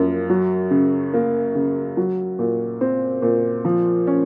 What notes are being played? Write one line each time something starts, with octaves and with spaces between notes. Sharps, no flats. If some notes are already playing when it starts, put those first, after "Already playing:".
Already playing: F#2 F3 A#3
F#3
C#3
A#3
C#3
F#3
A#2
C4
A#2
F3
C#4